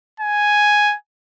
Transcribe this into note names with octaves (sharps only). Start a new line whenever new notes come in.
G#5